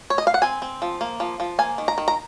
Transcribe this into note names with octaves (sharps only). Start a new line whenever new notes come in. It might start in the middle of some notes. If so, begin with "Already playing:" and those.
C#5
D#5
F5
F#5
C4 G#5
C4
F3
A#3
F3
F3
A#3 G#5
D#3
A#5
D#3
A#5